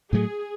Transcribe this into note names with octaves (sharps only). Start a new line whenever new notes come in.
A2 F#3 A3 G#4